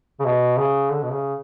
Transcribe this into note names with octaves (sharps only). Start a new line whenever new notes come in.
C#3
B2
C#3
D3
B2
C#3